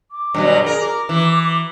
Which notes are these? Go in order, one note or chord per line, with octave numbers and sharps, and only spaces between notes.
D6
G2 B2 F#3
G#4 A#4
D6
E3